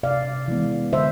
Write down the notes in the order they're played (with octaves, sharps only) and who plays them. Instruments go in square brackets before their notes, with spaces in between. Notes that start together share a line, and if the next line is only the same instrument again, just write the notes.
[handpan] C3 D5 F5
E3 G#3 B3
D3 C5 E5